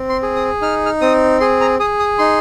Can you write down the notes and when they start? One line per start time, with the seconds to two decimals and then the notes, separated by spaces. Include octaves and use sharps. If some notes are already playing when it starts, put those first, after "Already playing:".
Already playing: C4
0.09 C6
0.23 G#4
0.36 D#6
0.62 D#4 F6
0.86 F6
1.01 C4 D#6
1.40 G#4 C6
1.61 A#5
1.79 G#4 D#6
1.99 D#6
2.19 D#4 C6